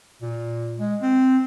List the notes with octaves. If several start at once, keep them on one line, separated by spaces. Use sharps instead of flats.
A#2
G#3
C4